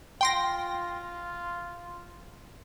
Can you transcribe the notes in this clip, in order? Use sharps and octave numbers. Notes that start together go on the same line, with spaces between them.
F4 G5 C6 A#6